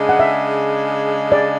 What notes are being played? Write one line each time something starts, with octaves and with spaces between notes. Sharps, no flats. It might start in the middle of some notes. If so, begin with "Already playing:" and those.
Already playing: C#3 G#3 D4
F#5
E5
D5